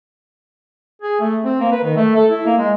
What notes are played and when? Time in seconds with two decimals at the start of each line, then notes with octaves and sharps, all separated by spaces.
1.02 G#4
1.20 A3
1.44 C4
1.60 A#3
1.71 B4
1.84 D#3
1.97 A3
2.15 A4
2.30 E4
2.46 A#3
2.58 G#3